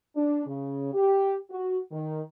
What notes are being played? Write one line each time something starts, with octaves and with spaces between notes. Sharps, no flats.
D4
C#3
G4
F#4
D#3